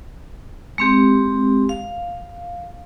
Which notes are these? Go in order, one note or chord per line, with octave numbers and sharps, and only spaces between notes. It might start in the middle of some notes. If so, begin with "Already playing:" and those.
G#3 C4 G4
F5